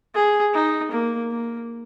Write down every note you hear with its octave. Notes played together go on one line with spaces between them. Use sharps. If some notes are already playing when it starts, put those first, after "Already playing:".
G#4
D#4
A#3
A#3